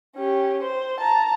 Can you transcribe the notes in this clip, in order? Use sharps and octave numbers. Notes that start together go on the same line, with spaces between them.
C#4 G4
C5
A5 A#5